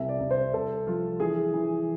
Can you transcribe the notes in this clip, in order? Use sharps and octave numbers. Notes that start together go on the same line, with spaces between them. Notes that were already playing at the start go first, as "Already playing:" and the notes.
Already playing: C2 E5
D5
C2
C5
C2 A4
F3 F4
E3 G#4
E3